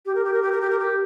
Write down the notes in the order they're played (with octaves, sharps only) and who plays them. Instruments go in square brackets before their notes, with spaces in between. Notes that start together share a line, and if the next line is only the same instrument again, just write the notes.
[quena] G4
A#4
G4
A#4
G4
A#4
G4
A#4
G4